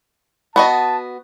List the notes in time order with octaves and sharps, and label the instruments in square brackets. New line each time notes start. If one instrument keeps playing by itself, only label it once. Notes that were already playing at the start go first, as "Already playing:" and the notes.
[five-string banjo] B3 F#4 D#5 [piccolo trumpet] A5